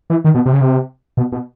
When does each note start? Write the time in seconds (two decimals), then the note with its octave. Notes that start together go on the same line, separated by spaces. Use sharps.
0.10 E3
0.24 D#3
0.34 B2
0.46 C3
0.53 C#3
0.61 C3
1.17 B2
1.32 B2